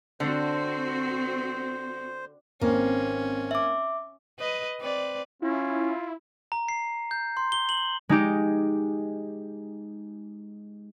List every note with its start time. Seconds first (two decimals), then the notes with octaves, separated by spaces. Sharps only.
0.20 D3 C4 F#4 C5
2.61 G#1 A#3 C4 C#4
3.51 E5 D6
4.39 B4 D#5
4.81 C4 B4 D5
5.42 C#4 E4 F4
6.52 A#5
6.69 C7
7.11 G6
7.37 C6
7.52 G7
7.69 F#7
8.09 G#3 D#4 G4